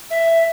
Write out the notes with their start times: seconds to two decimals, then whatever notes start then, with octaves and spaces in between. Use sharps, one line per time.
0.11 E5